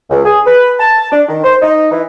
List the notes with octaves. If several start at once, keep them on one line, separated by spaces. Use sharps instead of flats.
C#2
G#4
B4
A5
D4
D#3
C5
D#4
E3